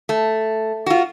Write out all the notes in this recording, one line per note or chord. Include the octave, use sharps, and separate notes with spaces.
A3
F4 F#4